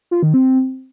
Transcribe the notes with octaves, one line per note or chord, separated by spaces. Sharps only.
F4
D#3
C4